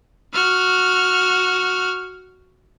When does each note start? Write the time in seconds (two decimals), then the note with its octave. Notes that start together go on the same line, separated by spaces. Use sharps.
0.34 F#4 F6